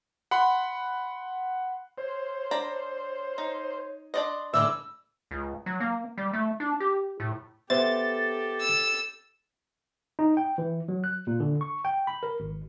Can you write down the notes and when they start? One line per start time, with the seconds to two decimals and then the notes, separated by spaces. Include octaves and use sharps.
0.31 F#5 B5 C6
1.98 C5 C#5
2.51 D4 A#5 B5
3.38 D#4
4.14 D4 D5 D#5 C6
4.54 A2 D3 G3 G#3 E5 D6 E6
5.31 C#2
5.66 F#3
5.80 A#3
6.18 G3
6.33 A3
6.60 D4
6.80 G4
7.20 A2
7.70 B3 G4 A4 C5 E5 A6
8.60 E6
10.19 D#4
10.37 G5
10.58 E3
10.88 F#3
11.04 F#6
11.27 A#2
11.40 D3
11.61 C#6
11.85 G5
12.07 B5
12.23 A#4
12.40 G#1